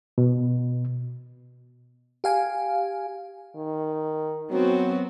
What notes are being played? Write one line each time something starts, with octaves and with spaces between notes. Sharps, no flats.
B2
G4 F5 G#5
D#3
F#3 B3 C4 F#4